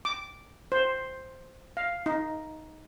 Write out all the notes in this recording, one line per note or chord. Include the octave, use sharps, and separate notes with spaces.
D6
C5
F5
D#4